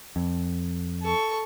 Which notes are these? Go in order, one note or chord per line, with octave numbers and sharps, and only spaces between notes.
F2
A4 C#6